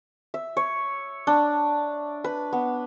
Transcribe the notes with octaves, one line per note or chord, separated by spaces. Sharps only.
E5
C#5
D4
B4
B3